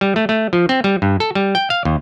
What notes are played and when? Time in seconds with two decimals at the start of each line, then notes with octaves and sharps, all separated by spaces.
0.01 G3
0.16 A3
0.29 A3
0.53 F3
0.69 C4
0.84 G3
1.02 G2
1.20 A4
1.35 G3
1.55 G5
1.70 F5
1.85 D#2